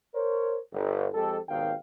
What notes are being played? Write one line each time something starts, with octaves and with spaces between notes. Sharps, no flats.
A#4 C5 C#5
G1
F2 G#3 G4 A4
G#1 D#2 B2 D#3 F5 G5